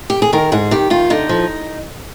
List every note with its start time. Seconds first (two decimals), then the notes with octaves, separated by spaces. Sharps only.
0.10 G4
0.22 G#4
0.33 D#3 A#4
0.52 G#2 G#4
0.71 D#3 G4
0.90 D#3 F4
1.10 D3 D#4
1.29 F3